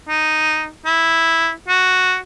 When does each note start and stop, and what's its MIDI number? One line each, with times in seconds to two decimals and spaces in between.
0.08 0.69 63
0.85 1.51 64
1.68 2.17 66